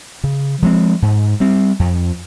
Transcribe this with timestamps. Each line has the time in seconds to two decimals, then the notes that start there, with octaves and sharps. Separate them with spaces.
0.24 C#3
0.62 F3 G#3 C4
1.02 G#2
1.40 G3 C4
1.79 F2